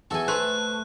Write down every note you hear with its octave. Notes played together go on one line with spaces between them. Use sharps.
E2 F#4 A4 G#5 C#6
A3 B4 C5 F#6